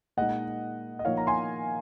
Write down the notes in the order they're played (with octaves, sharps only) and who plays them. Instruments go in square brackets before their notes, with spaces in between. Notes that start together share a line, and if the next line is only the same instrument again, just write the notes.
[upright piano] A#2 G#3 D#4 [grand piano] D#5 F#5
[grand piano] D#5
[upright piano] A#2 F3 A#3 D#4 [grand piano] C#5 F5
[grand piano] A#5
G#5 C6